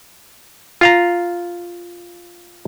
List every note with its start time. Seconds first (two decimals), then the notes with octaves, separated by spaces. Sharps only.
0.81 F4 F5 A#5